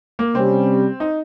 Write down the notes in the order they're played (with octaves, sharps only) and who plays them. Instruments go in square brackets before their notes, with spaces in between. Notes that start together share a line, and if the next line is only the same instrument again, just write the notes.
[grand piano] A#3
[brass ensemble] C3 G3 C#4 G4 [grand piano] C4
[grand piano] D#4